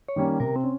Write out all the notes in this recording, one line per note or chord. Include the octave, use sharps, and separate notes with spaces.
C#5
D#3 G3 A#3 C#4
C3 A#4
C4
C#4